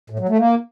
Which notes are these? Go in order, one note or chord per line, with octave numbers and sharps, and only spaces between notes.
A2
F#3
A3
A#3